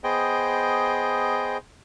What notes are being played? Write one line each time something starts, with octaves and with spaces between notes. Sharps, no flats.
B3 G#4 C5 D#5 G5